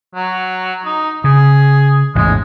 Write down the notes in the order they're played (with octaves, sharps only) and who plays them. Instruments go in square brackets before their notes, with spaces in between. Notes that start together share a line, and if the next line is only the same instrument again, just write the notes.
[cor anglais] F#3
D#4
[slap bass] C#3 [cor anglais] G#4
[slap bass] A1 E2 G#2 [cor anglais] G#3